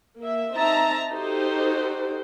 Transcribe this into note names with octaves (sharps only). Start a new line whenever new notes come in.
A#3 E5
C4 D#4 E5 A5 A#5
D#4 F#4 G4 A4 C5